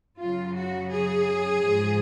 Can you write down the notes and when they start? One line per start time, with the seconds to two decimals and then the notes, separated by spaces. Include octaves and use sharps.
0.19 F#2 C#3 F#3 F4
0.56 F#4
0.91 G#4
1.63 G#2 F3